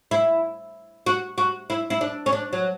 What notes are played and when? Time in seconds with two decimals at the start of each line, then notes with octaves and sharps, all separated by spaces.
0.11 E4
1.06 F#4
1.38 F#4
1.70 E4
1.90 E4
2.01 D4
2.26 C#4
2.33 D4
2.53 F#3